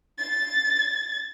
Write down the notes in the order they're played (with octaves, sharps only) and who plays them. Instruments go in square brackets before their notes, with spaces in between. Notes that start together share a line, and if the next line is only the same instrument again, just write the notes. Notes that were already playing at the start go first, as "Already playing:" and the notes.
[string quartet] A6